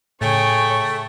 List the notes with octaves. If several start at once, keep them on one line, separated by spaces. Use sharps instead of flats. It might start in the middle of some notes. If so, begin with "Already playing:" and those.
A2 C#3 A3 G#4 C#5 G5